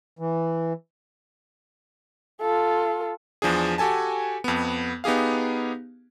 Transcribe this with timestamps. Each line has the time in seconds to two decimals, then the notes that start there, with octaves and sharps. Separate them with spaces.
0.19 E3
2.41 F4 A4
3.42 E2 F3 D4 G#4
3.78 F#4 G4 A4 G#5 A5
4.44 F2 B3
5.04 B3 D#4 G4 G#4 F5